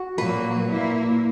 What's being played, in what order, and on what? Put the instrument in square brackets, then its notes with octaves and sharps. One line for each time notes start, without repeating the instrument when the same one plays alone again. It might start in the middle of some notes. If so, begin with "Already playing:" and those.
Already playing: [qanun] F#4
[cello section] A#2 F#3 A#3 [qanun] B4
[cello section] A#2 A#3 E4